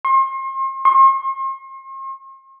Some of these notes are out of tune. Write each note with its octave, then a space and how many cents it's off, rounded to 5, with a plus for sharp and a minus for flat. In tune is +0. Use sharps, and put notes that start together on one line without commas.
C6 +40
C6 +45